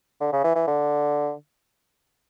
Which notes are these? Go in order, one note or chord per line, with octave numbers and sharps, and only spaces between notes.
D3
C#3
E3
E3
D3